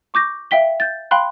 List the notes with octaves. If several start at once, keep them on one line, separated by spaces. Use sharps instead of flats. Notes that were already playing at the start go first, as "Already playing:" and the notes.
C#6 D6 G6 A#6
E5 F5 G5 B6 G7
G6 A6
F5 G5 B5 C6 F#6